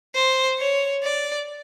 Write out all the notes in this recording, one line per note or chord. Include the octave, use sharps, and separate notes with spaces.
C5
C#5
D5